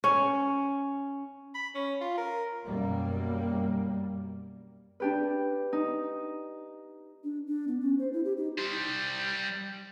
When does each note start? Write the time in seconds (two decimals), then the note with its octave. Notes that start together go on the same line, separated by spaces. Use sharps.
0.04 C#4
1.55 B5
1.75 C#4
2.01 F4
2.18 A#4
2.66 F#2 B2 G3 A#3
5.00 D4 G4 B4
5.73 D#4
7.24 D4
7.47 D4
7.68 B3
7.81 C#4
7.99 C5
8.13 E4
8.24 G4
8.37 D#4
8.59 G3 C5